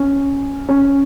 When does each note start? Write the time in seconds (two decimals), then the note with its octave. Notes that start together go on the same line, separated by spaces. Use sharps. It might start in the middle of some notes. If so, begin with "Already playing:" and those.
Already playing: C#4
0.69 C#4